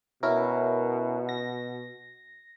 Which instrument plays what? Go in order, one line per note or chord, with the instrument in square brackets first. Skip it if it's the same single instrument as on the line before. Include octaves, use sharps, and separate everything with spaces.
[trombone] B2 [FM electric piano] C#4 E4 A#4
[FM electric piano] A#6